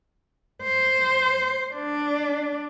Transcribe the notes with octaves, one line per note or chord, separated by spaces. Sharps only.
C5
D4